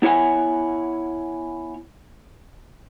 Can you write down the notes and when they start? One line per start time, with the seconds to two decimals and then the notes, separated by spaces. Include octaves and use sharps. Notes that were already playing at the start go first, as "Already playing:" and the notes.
0.02 B3 E4 C#5 F#5 G#5